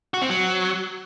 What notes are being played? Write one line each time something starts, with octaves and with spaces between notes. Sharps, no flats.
F#4
C4
F#3